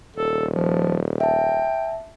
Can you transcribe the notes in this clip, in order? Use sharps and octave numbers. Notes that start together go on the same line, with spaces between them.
D#1 A4
F3
E5 G5 A5